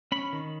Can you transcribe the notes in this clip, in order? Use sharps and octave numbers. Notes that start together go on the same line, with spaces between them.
C#4 B5
D#3